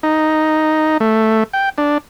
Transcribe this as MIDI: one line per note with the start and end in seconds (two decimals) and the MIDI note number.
0.03 0.98 63
1.00 1.44 57
1.53 1.69 79
1.78 1.98 62